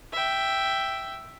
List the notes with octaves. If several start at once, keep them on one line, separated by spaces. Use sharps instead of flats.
E5 G5